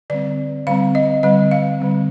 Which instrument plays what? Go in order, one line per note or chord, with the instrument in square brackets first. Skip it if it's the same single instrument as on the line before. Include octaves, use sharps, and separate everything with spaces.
[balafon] D3 G3 C4 D5
D3 G3 C4 F5
D#5
D3 G3 C4 D#5
F5
D3 G3 C4